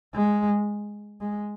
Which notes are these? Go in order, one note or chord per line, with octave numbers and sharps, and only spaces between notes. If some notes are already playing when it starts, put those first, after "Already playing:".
G#3
G#3